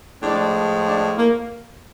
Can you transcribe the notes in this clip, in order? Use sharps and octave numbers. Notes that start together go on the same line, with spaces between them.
A2 F3 G#3 D4
D4
A#3